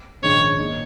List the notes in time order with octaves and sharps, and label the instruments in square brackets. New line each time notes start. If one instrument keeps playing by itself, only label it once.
[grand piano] A#1 G#2 D#3 G#3 C#4 [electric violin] C#5
[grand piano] A#2 G#3 D#4